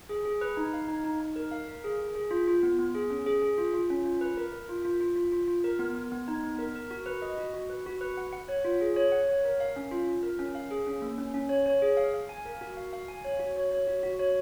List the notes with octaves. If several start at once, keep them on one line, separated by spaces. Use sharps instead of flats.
G#4
G#4
B4
D#4
F5
D#4
D#4
D#4
A#4
F5
A#4
G#4
G#4
G#4
F4
F4
B3
B3
G#4
C#4
G#4
G#4
F4
F4
C#4
F4
B4
A#4
A#4
F4
F4
F4
F4
F4
F4
A#4
B3
B3
B3
D#4
B3
A#4
A#4
F#4
B4
D#5
F#4
F#4
B4
F#4
B4
F#5
F#5
C#5
F4
G#4
C#5
F#5
C#5
A#4
F5
C#4
F4
F4
A#4
C#4
F5
G#4
C#4
A#3
C#4
C#4
C#5
C#5
G#4
F5
F5
G#5
A#4
F#4
F5
F5
G#5
C#5
F#4
C#5
C#5
F#4
F#4
C#5